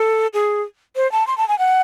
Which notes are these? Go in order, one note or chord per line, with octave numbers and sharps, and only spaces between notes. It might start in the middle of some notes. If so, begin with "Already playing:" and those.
Already playing: A4
G#4
C5
A5
C6
A5
G#5
F#5